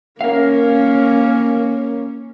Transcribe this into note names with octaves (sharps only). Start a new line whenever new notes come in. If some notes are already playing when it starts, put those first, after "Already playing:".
A#3 C#4 A#4 F5